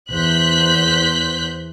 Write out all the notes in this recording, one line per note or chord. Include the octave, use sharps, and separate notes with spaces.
E2 C5 F#6 G6 B6